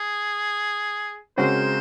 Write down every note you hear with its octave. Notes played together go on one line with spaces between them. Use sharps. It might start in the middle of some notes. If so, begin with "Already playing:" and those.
Already playing: G#4
C#3 G#3 C4 F#4 A#4 C5